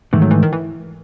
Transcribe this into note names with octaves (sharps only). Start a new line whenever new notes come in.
G#2 D#3 E3 A3
F#3
E3
D#3
E3